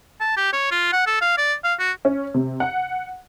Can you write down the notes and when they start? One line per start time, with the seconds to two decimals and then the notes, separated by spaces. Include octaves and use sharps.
0.21 A5
0.37 G4
0.53 C#5
0.71 F4
0.92 F#5
1.06 A4
1.21 F5
1.37 D5
1.64 F5
1.79 F#4
2.05 C#4
2.34 C3
2.60 F#5